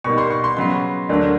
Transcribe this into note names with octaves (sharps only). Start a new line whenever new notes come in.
B2 G3 A#3 D#4 C#6
C6
C#6
C6
C#3 F#3 B3 C6
D2 D3 F#3 A#3 D4